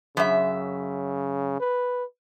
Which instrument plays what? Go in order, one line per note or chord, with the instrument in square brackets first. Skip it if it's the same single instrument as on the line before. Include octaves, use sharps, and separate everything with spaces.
[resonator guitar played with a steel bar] F#2 E5 [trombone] C#3
[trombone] B4